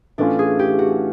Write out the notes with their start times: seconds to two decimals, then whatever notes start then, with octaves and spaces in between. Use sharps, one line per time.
0.18 A2 E3 A3 C#4 D4 F4
0.39 G#4
0.59 G4
0.79 F#4